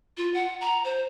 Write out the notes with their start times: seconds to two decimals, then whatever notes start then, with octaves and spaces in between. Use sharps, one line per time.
0.17 F4
0.34 F#5
0.61 A#5
0.85 C5